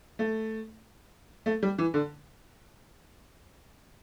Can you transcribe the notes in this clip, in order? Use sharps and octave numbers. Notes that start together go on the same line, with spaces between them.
A3
A3
G3
E3
D3